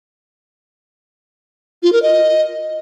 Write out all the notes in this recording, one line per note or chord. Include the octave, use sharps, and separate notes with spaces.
F4
A#4
D#5